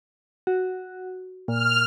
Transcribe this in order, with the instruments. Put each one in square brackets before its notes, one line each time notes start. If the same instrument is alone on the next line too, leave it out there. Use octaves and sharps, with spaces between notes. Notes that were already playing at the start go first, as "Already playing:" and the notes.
[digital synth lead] F#4
[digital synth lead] A#2 [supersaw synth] F6